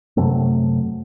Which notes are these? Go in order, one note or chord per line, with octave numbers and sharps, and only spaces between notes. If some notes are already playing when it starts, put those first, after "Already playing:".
F#2 C3 F#3 A3